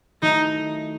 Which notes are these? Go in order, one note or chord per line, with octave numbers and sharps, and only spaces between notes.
D#3 F#3 A3 D#4 E4 A4